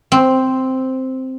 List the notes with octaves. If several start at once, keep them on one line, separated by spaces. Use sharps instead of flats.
C4